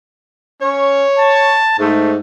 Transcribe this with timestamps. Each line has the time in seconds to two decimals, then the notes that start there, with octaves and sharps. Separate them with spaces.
0.62 C#4 C#5
1.18 A5
1.79 G#2 A3